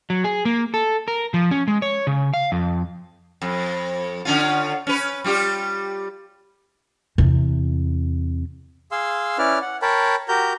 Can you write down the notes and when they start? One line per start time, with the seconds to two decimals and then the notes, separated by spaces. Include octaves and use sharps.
0.10 F#3
0.24 G#4
0.45 A#3
0.74 A4
1.08 A#4
1.34 F3
1.51 C#4
1.68 G#3
1.82 C#5
2.07 C#3
2.34 F5
2.52 F2
3.42 F2
4.25 D3 C#4 F4
4.87 C#4 B4
5.24 G3 F4 G4
7.18 E2 C3
8.92 G#4 F5 C6 E6
9.38 C#4 E4 B4 D5 F6
9.62 F#5
9.82 A#4 C#5 G5 A5 B5
10.29 F#4 G4 A#4 A#5 G6